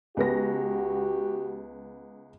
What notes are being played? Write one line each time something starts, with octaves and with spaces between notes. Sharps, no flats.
C#2 B3 F#4 G4 A#6